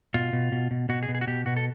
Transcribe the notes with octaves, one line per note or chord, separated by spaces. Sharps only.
B2 F4
B2
B2
B2
B2 F#4
G#4
B2
G#4
F#4
B2 G4
B2 F#4
A4